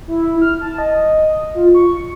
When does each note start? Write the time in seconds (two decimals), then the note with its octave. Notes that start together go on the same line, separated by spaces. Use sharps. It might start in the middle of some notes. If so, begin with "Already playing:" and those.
0.08 E4
0.41 F6
0.61 A5
0.78 D#5
1.54 F4
1.75 C#6